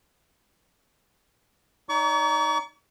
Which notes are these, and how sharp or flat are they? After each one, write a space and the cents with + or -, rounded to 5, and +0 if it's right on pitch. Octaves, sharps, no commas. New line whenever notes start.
D#4 +0 D5 -45 C#6 +40